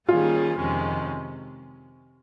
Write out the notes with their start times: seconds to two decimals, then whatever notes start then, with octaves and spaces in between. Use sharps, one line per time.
0.09 D#3 G3 A#3 C#4 F4 G#4
0.58 F2 C3 D#3 G#3 C#4